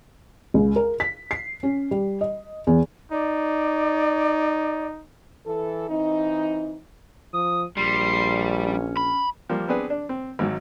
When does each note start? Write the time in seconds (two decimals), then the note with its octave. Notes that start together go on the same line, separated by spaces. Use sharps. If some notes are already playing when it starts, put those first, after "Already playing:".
0.54 C#2
0.76 A#4
1.00 B6
1.31 C7
1.63 C#4
1.91 G3
2.21 D#5
2.67 E2
3.12 D#4 D5
5.46 E3 A4
5.89 E3 C4 D#4
7.34 F3 D#6
7.77 A#1 G3 C6
8.65 C#4
8.97 B5
9.50 F3 G3 A#3
9.68 B3 C4 D4 G#4 B4
9.90 D4
10.09 C4
10.39 G#1 G#2 F#3